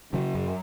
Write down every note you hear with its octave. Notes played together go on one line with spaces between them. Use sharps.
C#3 F#3
F#2